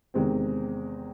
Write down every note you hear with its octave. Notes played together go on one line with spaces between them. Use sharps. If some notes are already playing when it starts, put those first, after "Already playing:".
E2 C3 D#3 G#3 C4